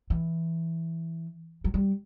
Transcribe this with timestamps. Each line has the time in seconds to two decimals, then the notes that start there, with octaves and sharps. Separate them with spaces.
0.10 E3
1.64 F#3
1.74 G3